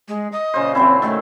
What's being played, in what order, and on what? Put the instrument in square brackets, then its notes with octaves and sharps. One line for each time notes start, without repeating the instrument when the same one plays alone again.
[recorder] G#3
D#5
[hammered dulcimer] A#2 C#3 C5
[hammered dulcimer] F#3 E4 [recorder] C4
[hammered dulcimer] D#3 A4 [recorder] A3